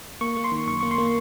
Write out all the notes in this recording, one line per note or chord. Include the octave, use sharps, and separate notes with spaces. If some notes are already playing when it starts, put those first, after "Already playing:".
A#3 C#6
A#3
C6
D#3
F#2 C#6
A#3 C#6
C6
A#3